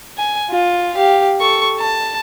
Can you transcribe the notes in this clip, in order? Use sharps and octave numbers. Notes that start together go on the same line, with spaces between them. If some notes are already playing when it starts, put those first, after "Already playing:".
G#5
F4
G4 F5
A4 C#6
A5